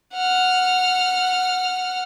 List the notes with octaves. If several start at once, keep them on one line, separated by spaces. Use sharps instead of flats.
F#5 F6